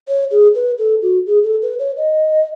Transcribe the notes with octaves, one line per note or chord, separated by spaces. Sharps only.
C#5
G#4
B4
A4
F#4
G#4
A4
B4
C#5
D#5